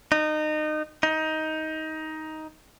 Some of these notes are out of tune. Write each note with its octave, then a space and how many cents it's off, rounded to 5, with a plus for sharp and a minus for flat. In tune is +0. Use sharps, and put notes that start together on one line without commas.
D#4 -25
D#4 +15